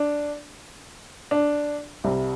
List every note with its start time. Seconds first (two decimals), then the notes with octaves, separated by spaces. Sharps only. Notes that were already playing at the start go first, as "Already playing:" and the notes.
Already playing: D4
1.31 D4
2.04 C2 C3 G3